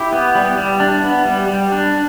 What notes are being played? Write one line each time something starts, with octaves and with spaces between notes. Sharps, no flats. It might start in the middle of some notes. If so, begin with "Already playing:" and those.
Already playing: E4 G4
B3
G3
G3
D4
B3
G3
G3
D4